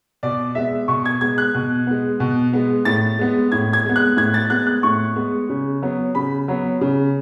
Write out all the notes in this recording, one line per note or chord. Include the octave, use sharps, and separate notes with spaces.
B2 D5
G#3 B3 E5
B2 C#6
G#6
G#3 B3 G#6
F#6
B2
G#3 B3
B2
G#3 B3
A2 A6
G#3 B3
A2 G#6
G#6
G#3 B3
F#6
A2 G#6
A6
G#3 B3 F#6
F#6
A2 C#6
G#3 B3
C#3
F#3 B3
C#3 B5
F#3 B3
C#3